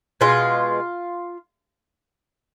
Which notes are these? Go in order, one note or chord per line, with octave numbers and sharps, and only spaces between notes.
B2 G#3 F4